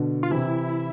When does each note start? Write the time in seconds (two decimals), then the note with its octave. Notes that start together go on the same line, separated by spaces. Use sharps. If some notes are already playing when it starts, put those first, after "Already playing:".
Already playing: B2 D3
0.23 F4
0.31 C3 E3 E4